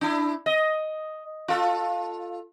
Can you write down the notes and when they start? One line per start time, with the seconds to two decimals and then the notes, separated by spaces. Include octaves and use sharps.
0.01 D4 E4
0.46 D#5
1.48 F4 A4